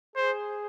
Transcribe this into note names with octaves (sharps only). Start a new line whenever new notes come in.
G#4 C5